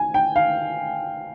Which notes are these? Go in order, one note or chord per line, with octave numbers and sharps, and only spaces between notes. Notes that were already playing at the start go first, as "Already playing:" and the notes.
Already playing: G#5
G5
F5